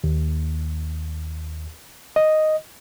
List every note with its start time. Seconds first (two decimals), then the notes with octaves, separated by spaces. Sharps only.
0.04 D#2
2.16 D#5